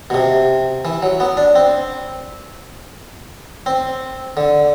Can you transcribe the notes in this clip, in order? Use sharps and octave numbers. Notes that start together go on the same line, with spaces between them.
B2
C3
E3
F#3
B3
D4
C4
C4
D3